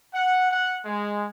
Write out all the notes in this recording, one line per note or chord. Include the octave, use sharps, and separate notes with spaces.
F#5
F#5
G#3